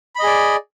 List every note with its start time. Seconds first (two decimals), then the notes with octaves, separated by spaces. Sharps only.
0.15 B5
0.19 D#5
0.23 G#4
0.27 D5